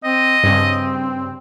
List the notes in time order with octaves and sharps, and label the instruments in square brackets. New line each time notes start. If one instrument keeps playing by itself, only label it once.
[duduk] C4 [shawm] D#5
[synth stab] G2 C#3 [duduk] C4